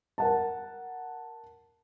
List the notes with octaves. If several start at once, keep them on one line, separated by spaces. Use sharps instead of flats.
A#4 F#5 A5